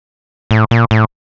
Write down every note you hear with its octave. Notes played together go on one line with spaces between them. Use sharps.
A2
A#2
A2